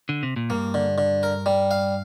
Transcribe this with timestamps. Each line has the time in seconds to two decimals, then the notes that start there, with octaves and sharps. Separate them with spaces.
0.09 D3
0.23 C3
0.36 A#2
0.50 G2 A#3
0.74 D3
0.98 D3
1.23 A#4
1.46 G3
1.71 F5